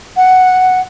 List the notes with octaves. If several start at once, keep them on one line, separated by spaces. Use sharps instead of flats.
F#5